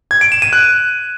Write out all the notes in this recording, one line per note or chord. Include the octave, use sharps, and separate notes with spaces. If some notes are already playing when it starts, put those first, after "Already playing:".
G#6
D7
E7
D#7
F#6